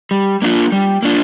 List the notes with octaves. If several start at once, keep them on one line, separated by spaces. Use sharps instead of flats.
G3
A#3 D4 F4
G3
A#3 D4 F4